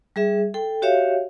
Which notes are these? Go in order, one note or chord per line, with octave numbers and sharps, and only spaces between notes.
G3 G#4 E5
A4 G5
F#4 G4 C#5 E5 F5